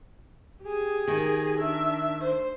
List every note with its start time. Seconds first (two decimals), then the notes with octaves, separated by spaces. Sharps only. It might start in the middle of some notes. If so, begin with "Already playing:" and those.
0.62 G4 G#4
1.08 D#3
1.57 D4 E5
2.24 C5